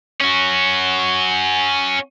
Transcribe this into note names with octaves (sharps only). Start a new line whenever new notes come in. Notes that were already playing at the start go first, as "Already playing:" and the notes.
C#4 F#4